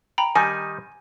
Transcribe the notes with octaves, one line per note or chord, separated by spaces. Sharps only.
G5 A#5 B5
D#3 G3 D#4 G#5